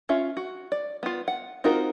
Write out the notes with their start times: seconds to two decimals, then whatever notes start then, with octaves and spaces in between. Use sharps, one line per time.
0.09 C#4 F4 E5
0.37 F#4
0.72 D5
1.03 B3 F4
1.28 F#5
1.64 C4 D#4 F4 F#4 A#4